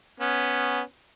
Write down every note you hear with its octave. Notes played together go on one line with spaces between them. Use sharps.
B3 C#4